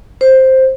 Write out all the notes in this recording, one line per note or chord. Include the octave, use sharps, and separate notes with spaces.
C5